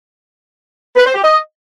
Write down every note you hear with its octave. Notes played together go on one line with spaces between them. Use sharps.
B4
C5
G4
D#5